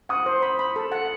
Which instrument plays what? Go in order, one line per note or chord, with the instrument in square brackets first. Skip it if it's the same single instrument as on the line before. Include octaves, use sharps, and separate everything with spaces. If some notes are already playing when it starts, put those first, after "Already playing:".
[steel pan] F#5 [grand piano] D#6
[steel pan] C5
B5
B5
A4
F#5